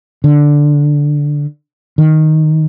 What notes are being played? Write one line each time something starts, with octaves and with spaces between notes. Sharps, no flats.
D3
D#3